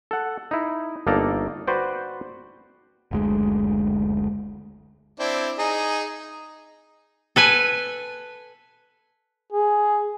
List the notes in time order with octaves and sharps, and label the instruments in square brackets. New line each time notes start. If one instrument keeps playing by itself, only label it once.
[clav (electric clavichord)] A4 F#5
D#4 E4
G1 A#3 D#4 A4 D5 A#5
F#4 B4 C5 D5 G5
[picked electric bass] F#1 D2 G#3
[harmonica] C4 D4 E4
D#4 G#4
[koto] A4 B4 G#5
[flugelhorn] G#4